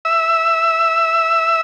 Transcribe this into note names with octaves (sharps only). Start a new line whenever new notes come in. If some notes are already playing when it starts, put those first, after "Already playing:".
E5 E6